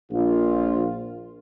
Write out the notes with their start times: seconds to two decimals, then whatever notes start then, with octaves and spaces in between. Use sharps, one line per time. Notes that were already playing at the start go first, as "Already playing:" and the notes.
0.12 A#1 F4